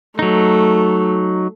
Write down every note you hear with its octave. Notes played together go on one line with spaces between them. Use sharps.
F#3 A3 D#4